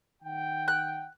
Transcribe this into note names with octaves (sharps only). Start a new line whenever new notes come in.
D#3 F#5 G5
F#6